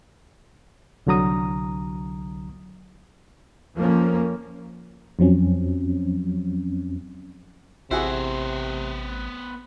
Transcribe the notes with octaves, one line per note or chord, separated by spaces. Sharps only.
C2 D3 F#3 A#5 D#6
F2 F3 A#3 C#4
F2 F3 F#3 C4 C#4
A1 C3 B3 E4 F#4 G#4 C5